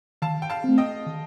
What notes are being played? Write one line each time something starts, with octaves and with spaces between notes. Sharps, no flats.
D#3 F5 A5
G5
F5 A5
A3 C4
D#5 G5
D#3